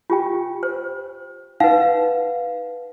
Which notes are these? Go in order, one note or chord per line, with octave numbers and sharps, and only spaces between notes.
F4 G4 G5
C5
D#4 B4 F5 F#5